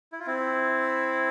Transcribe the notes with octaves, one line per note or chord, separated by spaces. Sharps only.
E4
F4
C4 E4